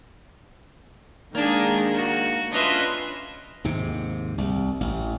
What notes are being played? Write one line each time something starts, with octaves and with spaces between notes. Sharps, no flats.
D#3 G#3 A#3 D4 G#4 A#5
F#4
C#4 D4 F4 B4 D#5 E5 C6
D#2 G#2 C3
C2
A1